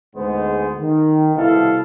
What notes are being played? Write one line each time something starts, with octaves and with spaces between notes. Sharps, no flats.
D2 G#2 G#3 B3 C5
D#3
C2 B2 E4 A4 F5